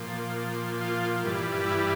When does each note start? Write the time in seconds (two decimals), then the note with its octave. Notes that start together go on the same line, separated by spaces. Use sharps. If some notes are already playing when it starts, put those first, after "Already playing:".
Already playing: A#2 F3
0.81 F4
1.25 G2 E3 G3
1.66 E4